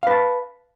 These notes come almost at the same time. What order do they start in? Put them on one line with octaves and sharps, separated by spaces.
F5 B4 A5